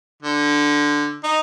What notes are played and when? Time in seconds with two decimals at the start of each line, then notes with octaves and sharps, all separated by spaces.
0.22 D3
1.24 D#4